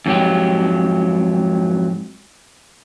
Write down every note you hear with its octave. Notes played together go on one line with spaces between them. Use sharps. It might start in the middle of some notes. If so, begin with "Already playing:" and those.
F2 G#2 F#3 G4